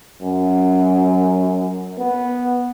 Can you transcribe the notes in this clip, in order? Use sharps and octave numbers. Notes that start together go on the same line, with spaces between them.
F#2
B3